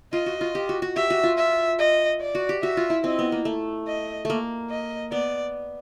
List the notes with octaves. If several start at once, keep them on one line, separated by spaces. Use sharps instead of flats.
F4 D#5
F#4
F4
G4
F#4
F#4
G4 E5
F#4
F4
E5
D#5
D5
F#4
G4
F#4 E5
F4
E4
C4 D#5
B3
A#3
A3
D#5
A3 A#3
D#5
B3 D5